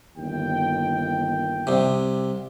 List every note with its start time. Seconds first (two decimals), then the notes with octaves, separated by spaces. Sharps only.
0.17 G1 D#2 G5
1.67 C2 C3